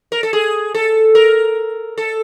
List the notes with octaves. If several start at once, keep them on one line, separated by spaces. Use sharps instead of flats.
A#4
A4
G#4
A4
A#4
A4